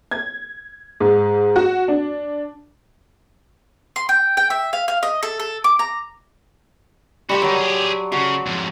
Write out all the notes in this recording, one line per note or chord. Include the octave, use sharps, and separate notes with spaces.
G#6
G#2
F#4
D4
C6
G5
G5
E5
F5
F5
D#5
A4
A4
D6
A#5
G3 F#4 G4 A5 C6
D#3 F#3 D5
G4 G#4
C#3 F#4
F2 G#2